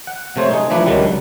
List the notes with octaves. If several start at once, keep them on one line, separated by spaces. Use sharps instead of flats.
F#5
C3 A3 C5 C#5
D#4 G#4
E3 F3 A3 D4 B4
C#2 D3 D#3 F#3 G3